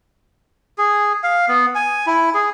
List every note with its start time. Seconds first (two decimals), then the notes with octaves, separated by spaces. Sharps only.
0.78 G#4
1.23 F5
1.48 B3
1.75 G#5
2.07 E4
2.34 G#4